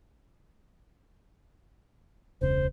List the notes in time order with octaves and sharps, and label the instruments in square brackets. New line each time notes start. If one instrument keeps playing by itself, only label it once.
[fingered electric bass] E1 C#2 C#3 [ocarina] C5